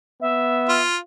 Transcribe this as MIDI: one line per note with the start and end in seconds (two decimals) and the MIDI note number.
0.21 0.85 59
0.21 0.81 76
0.69 0.97 65